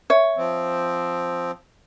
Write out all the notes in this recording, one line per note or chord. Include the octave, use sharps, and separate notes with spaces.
C#5 E5
F3 C4